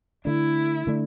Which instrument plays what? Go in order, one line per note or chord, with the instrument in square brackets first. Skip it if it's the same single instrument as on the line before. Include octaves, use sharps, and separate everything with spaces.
[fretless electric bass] D3 A3 D4 [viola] E4
[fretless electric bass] D3 A3 D4